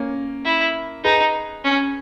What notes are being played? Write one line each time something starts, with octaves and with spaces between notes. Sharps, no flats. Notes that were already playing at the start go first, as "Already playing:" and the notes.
Already playing: A#3 C#4
E4
D#4 G#4 B4
C#4